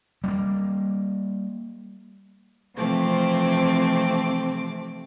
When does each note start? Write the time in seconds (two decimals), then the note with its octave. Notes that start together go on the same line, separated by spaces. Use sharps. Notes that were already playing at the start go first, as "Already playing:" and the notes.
0.24 G3 A3 A#3
2.74 C3 E3 F3 A3 C4 D6